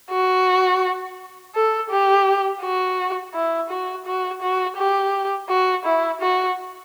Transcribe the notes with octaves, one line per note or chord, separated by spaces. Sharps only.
F#4
A4
G4
F#4
E4
F#4
F#4
F#4
G4
F#4
E4
F#4